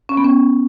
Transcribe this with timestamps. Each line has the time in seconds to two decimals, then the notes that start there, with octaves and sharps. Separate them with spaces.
0.09 C#4
0.17 B3
0.24 C#4